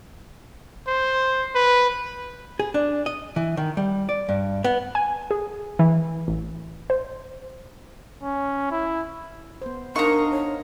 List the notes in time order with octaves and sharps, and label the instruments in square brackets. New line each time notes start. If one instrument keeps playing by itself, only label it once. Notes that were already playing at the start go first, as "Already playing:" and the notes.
[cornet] C5
B4
[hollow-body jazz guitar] G#4
D4
D#5
E3
D#3
G3
D5
G2
B3
[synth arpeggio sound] G#5
G#4
E3
A1
C5
[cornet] C#4
E4
[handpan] B3 C5
[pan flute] D4 [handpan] D#4 D#5 F5 [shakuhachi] A#4 [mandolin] A#5 C#6
[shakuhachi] C#5